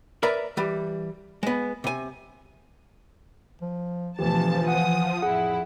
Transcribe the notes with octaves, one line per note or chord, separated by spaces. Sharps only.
A#4 B4 D5 E5 A#5 B5
E3 G3
G#3 B3
C3 G#5
F3
D2 B2 E3 F3 G4 A5
F#5 D#6
F2 A2 E4 G#4 F#5